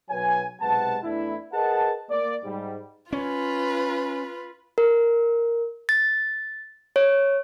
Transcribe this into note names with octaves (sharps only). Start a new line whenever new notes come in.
B1 F#3 B4 C#5 G#5
B1 C3 G#3 B4 F#5 A5
E2 E3 A3 D4 E4
G#4 A#4 B4 D#5 F#5 A5
A#3 D5
G#2 G3
C#4 F4 B4
A#4
A6
C#5